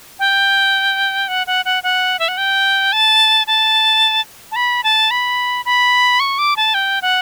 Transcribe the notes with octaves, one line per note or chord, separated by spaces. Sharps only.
G5
F#5
F#5
F#5
F#5
E5
F#5
G5
A5
A5
A5
B5
A5
B5
B5
C#6
D6
A5
G5
F#5